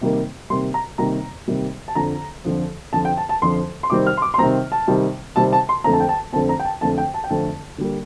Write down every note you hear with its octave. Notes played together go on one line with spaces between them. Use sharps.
C3 D#3 G3 A#3
C3 D#3 G3 A#3 C6
A#5
C3 D#3 G3 A#3 A#5
C3 D#3 G3 A#3
A5
F2 D3 F3 A#5
F2 D3 F3
F2 D3 F3 A5
G5
A5
A5
F2 D3 F3 C6
C6
C3 D#3 G3 C4 D6
F6
C6
D6
C6
C3 D#3 G3 C4 A#5
A5
C3 D#3 G3 C4
C3 D#3 G3 C4 A5
A5
C6
F2 D3 A3 C4 A#5
A5
G5
A5
F2 D3 A3 C4 A5
A#5
G5
A5
F2 D3 A3 C4 A5
G5
A5
G5
F2 D3 A3 C4 A5
D3 G3 A#3